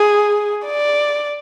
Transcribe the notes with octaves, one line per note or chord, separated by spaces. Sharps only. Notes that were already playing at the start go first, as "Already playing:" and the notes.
Already playing: G#4
D5